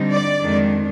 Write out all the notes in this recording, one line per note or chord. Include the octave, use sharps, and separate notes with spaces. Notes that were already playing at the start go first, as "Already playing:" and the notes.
Already playing: D3 G3 C4 D#4
D5
F2 D#3 G#3 D4